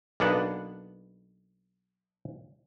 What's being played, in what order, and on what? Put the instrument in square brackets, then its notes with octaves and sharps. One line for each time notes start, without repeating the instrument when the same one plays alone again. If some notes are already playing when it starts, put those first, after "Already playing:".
[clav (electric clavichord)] B1 A#3 B3 D4 F#5